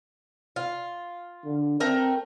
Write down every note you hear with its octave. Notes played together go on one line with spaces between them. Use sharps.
F4
D3
A3 C4 A#4 G5